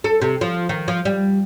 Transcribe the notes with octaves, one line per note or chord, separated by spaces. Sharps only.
A4
C3
F3
D#3
F3
G3